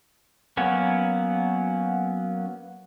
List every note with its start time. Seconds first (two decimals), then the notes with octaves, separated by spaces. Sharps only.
0.57 F#3 A#3 B3 C#4